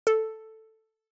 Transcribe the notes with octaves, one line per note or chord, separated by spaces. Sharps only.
A4